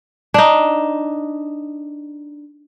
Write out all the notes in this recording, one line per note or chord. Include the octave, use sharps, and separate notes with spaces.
D4 D#4